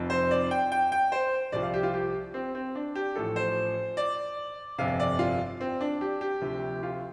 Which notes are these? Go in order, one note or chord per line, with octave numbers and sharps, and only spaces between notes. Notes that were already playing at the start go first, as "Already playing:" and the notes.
Already playing: F1 F2 F3
C5
D5
G5
G5
G5
C5
C2 C3 F3 D5
F5
G4
F4
G4
C4
C4
D4
G4
A1 A2 F3 A4
C5
D5
G1 F2 C3 F5
D5
F4
C4
D4
G4
G4
D2 C3 F3
F4